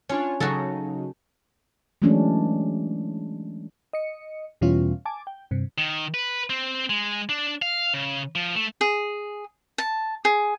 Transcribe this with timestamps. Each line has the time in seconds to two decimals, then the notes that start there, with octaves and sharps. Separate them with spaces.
0.09 C#4 D4 F4 C#5
0.40 C#3 F#3 D#4 F#4 A4
2.02 E3 F#3 G#3 A3 C#4 D4
3.93 D#5 C#7
4.61 E2 B2 E3 G3 C#4 F4
5.05 G#5 A5 D6
5.27 G5
5.51 G2 C3
5.78 D#3
6.14 B4
6.50 C4
6.90 G#3
7.29 D4
7.62 F5
7.94 C#3
8.35 F3
8.56 A3
8.81 G#4
9.78 A5
10.25 G#4